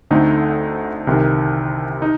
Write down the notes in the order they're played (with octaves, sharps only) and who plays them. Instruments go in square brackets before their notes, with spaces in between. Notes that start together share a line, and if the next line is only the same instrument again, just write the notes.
[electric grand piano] D2 D3 A3 C4 D#4
C2 C3 D#3
D#4